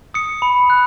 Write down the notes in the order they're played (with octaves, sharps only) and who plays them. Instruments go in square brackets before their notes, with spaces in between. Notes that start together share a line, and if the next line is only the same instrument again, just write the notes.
[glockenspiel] D#6 C#7
B5
F#6